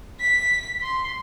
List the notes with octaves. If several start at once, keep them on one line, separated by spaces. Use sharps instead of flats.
B6
C6